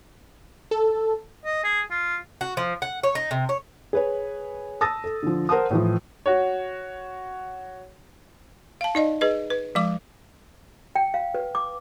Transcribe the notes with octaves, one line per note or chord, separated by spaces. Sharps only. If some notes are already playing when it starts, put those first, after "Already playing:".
A4
D#5
G#4
F4
F#4
F3
F#5
C#5
D#4
C3
C#5
G#4 B4 C#5
A5 D#6 E6 A6 A#6
A4
D3 F3
A#4 C5 F#5 A5 D#6
A2 E3 F3
F#4 C#5
F5 A5
D#4 D5 D#5
G#4 B4 D#5
B4
F3 G#3 D6
G5
F5
B4
D6